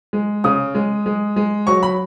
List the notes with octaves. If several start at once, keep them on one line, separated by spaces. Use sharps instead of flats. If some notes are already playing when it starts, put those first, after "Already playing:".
G#3
C#3 D#6
G#3
G#3
G#3
F#3 C#6
B5